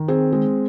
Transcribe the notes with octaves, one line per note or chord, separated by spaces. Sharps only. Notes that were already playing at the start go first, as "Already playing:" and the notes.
Already playing: D#3
C4 G#4
G#3